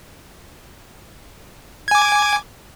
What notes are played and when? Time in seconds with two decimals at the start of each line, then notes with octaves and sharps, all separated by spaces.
1.88 G#6
1.91 G#5
1.95 D6